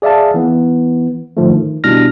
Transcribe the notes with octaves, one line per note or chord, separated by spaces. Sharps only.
G#4 D5 E5 F5 A5
E3 B3
G#2 D3 F3 A3
D#3
B2 G3 D4 E4 F6 A#6